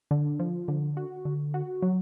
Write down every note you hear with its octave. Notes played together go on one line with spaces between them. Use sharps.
D3
F3
D3
F#4
D3
F#4
F#3